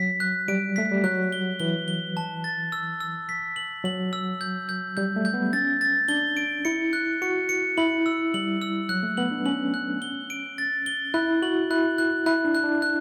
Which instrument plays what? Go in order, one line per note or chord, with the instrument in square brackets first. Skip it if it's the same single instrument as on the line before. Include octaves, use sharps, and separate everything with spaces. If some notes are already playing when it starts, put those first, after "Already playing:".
Already playing: [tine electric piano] F#3 [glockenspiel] B6
[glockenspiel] F#6
[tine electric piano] G3 [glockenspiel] D7
[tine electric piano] A3 [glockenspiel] B6
[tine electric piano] G3
[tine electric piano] F#3 [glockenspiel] F#6
[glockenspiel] G7
[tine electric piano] E3 [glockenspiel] G7
[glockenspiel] G7
A5
A6
E6
E6
B6
F#7
[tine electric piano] F#3 [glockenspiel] F#7
[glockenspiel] E6
G6
G6
[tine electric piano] G3 [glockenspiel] G6
[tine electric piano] A3
[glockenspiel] G6
[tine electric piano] B3
[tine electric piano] C#4 [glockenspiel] A6
[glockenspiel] A6
[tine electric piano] D4 [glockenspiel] G7
[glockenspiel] D7
[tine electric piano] E4 [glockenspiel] C#7
[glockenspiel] F#6
[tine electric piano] F#4 [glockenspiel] C#7
[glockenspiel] C#7
[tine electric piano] E4 [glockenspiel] F#7
[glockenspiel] E6
[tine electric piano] G3 [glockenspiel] F#7
[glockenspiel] E6
[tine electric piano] F#3 [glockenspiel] F#6
[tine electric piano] A3
[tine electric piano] B3 [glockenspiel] F#7
[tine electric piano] D4
[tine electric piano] C#4 [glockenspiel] F#7
[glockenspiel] F#6
G7
D7
A6
G7
[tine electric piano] E4 [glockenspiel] F#6
[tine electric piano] F#4 [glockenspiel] F#7
[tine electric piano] E4 [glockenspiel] F#6
[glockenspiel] F#6
[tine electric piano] E4 [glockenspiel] F#6
[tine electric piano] D4
[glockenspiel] F#6
[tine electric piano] D4
[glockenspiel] F#6